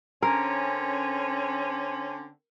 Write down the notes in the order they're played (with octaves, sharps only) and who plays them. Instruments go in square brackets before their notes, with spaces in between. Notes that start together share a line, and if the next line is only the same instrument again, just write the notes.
[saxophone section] D3 C4 C#4 [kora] A#4